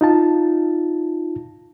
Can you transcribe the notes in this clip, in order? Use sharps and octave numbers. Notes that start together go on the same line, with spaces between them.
D#4 F4 A5